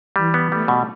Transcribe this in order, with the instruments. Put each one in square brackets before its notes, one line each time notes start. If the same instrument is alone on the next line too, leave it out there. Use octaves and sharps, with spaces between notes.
[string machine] E3 [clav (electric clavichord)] G3
[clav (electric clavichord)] B3
[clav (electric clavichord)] G3 [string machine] A3
[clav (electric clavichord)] B2